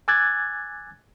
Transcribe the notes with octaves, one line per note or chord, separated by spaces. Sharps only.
G#5 D6 E6 F#6 G#6 A6